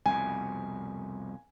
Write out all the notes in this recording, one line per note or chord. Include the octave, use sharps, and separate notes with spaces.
C2 F2 B2 G#5